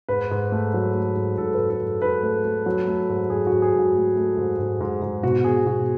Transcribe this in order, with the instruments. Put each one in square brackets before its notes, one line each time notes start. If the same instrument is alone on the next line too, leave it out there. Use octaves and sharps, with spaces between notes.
[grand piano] G#2 B4
G#2
A3
F#3
A3
G#2
G#2 A4
G#2 B4
A4
G#2
G#2 B4
A3
A3
F#3
A3
G#2
G#2 G#4
G#2 F#4
G#4
G#2
F#4
A3
A3
G#2
G#2
G#2
G#2
B2 F#4
B2 G#4
B2 F#4